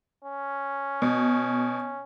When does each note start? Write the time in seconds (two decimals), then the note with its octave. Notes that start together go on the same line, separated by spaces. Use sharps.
0.25 C#4
1.02 B2